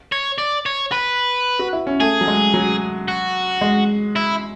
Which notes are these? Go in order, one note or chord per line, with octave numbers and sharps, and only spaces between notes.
C#5
D5
C#5
B4
F#4
E4
C#4
A3 G#4
F#3
G#3
F#3
F#4
G#3
E4